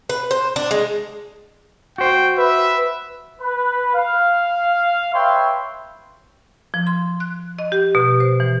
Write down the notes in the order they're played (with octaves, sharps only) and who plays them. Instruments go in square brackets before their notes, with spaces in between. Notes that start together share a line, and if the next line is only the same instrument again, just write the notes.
[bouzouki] B4
C5
D4
G#3
[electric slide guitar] F#4 C5 [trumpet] G5
[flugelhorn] B4 [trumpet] E5
[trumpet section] B4
F5
B4 C#5 E5 G5 C6
[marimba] F3
C6
F#6
D#5
G4
B2
C5
E3